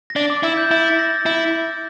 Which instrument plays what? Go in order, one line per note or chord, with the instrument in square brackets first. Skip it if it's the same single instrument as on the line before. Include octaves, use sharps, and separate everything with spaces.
[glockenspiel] A#6
[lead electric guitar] D4 [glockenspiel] A6
[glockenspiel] D6
[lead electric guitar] E4 [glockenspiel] E6
[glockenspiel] G6
[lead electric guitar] E4 [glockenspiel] A6
[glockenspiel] A6
A#6
[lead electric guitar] E4